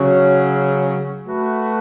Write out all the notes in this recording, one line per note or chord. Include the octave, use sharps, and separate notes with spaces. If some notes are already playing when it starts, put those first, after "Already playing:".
Already playing: C#3 F#3 C#4
A3 F#4 B4